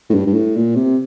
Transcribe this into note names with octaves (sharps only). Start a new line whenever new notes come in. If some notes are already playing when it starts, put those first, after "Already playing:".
A2
G2
G2
A2
A#2
C3